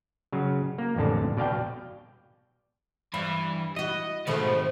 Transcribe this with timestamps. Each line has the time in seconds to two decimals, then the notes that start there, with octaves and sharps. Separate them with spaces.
0.33 C#3 F#3
0.78 A#3
0.96 A1 F2 D3 A5
1.37 B2 D5 F5 G5
3.14 G2 E3 B5
3.76 E4 F#4 D#5
4.27 B2 D#3 F3 A3 G#4